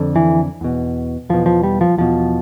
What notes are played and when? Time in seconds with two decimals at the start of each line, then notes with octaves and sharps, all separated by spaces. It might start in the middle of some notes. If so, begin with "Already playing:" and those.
Already playing: F2 D3
0.16 E3
0.61 E2 B2
1.29 E2 B2 F3
1.46 F3
1.63 G3
1.81 F3
1.98 E2 B2 F3